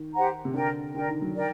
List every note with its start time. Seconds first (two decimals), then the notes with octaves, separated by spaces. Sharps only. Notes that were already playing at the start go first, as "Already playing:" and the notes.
Already playing: D#3
0.14 G4 C5 F#5 A#5
0.45 C3
0.54 D3 A#4 D5 G5
0.94 D3 A#4 D5 G5
1.08 D#3
1.22 F#3
1.34 D#3 A#4 D5 G5